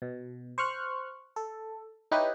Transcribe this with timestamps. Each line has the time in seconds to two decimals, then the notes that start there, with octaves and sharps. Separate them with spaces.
0.02 B2
0.58 C5 C#6 F6 F#6
1.36 A4
2.12 D#4 E4 G4 B4 C#5